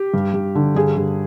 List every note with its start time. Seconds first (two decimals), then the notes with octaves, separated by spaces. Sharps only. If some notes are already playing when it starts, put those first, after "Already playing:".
Already playing: G4
0.14 G2
0.34 G2
0.55 D3
0.75 G2 G#4
0.97 G2